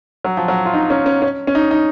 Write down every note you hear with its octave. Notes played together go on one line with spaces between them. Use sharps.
F#3
F3
F#3
F4
D#4
C#4
C#4
C#4
C#4
D#4
D#4